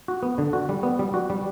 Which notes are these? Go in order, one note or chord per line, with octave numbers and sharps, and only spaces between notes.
F#4
B3
D3
F#4
G3
B3
G3
F#4
G3